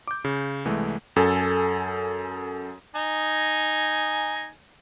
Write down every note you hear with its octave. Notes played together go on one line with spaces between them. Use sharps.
D6 G6
C#3
C2 E3 G#3 A3
F#2 A4 G#5
D#4 G#5